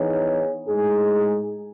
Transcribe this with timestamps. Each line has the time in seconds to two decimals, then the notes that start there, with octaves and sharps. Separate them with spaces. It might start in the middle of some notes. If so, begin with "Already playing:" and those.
Already playing: E3 B3 D#4 G#4 C#5
0.67 A2 G#3 D#4 G#4